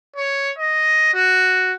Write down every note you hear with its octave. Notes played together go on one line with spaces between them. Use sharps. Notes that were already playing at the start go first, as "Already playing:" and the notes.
C#5
D#5
F#4